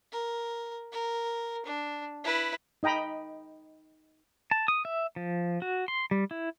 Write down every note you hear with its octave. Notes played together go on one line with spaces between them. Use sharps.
A#4
A#4
D4
E4 B4
D#4 D#5 G5 A#5 B5
A5
D#6
E5
F3
F#4
C6
G3
E4